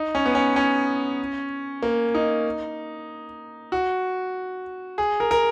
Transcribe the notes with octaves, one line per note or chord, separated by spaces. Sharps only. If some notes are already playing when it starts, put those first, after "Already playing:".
Already playing: D#4
C#4
B3
C#4
C#4
A#3
D#4
F#4
G#4
A#4
A#4